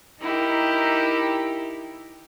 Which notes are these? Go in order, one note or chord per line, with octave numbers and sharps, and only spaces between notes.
D#4 E4 G4 A#4